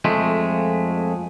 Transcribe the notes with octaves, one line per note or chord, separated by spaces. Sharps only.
F2 G#3 A3